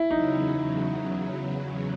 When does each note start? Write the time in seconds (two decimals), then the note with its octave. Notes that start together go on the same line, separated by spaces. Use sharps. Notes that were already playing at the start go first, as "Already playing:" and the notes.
Already playing: E4
0.10 E2 C#3 F#3 D#4
0.60 E2 C#3 F#3